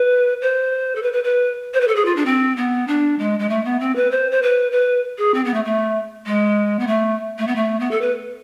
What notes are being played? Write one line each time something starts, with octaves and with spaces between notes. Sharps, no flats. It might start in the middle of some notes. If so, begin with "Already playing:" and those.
Already playing: B4
C5
A4
B4
B4
B4
C5
B4
A4
G#4
F4
D4
C4
B3
D4
G#3
G#3
A3
B3
C4
B4
C5
C5
B4
B4
G#4
C4
B3
A3
A3
G#3
B3
A3
A3
B3
A3
B3
A4
B4